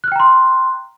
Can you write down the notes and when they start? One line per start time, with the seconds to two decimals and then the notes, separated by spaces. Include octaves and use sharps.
0.04 F#6
0.08 F6
0.12 G5
0.16 A#5
0.20 C6